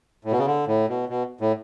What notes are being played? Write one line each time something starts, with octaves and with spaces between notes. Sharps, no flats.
A2
B2
C#3
D3
A2
B2
B2
A2